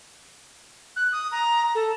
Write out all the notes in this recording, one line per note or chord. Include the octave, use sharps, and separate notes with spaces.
F#6
D#6
A#5
A4